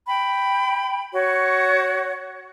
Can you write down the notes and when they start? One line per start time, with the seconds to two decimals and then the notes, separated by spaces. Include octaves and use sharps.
0.06 G5 B5
1.13 F#4 C#5